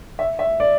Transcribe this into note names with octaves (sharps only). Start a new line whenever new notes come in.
E5
E5
D5